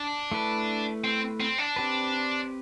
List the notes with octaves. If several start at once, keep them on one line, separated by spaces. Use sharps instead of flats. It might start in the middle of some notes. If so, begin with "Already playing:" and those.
Already playing: D4
A3 E4 B4
C4
C4
D4
C4 G4 B4